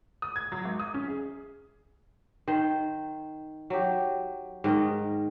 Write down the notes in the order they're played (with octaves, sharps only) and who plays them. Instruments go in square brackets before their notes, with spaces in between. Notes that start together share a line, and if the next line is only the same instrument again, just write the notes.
[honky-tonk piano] D#6
G#6
F#3
G#1
D#6
C#4
G#4
[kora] D#3 C5
F#3 G4
G#2 D#3 A#4 D#5